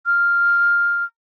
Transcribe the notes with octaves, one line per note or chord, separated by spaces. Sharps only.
F6